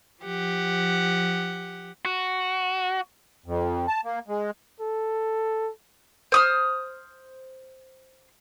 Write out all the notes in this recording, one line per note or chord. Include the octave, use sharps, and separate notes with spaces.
F3 G4 F#5
F#4
F2
A5
A#3
G#3
A4
C5 D#6 F6